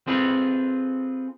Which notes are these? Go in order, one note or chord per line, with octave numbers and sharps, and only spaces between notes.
C4 F4 G#4 A4 B4